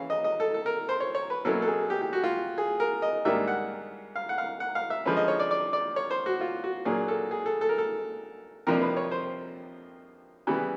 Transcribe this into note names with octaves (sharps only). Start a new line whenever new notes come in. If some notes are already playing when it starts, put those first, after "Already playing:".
Already playing: C#3 E3 C#4 F5
D#5
D#5
A4
A4
A#4
C5
C#5
C#5
B4
B2 F#3 A#3 C#4 E4 A4
A4
G#4
G4
G4
F#4
F4
G#4
A#4
D#5
G#2 D#3 G3 A#3 D4 E5
F#5
F5
F#5
F5
F#5
F5
E5
D3 F3 G#3 C#4 B4
D#5
C#5
D5
D5
D5
C#5
C5
F#4
F4
F#4
A#2 F#3 A#3 D4 G#4
A4
G#4
A4
A4
A#4
A4
F2 C3 F3 A#3 D4 A#4
B4
C#5
C5
C#3 E3 G3 B3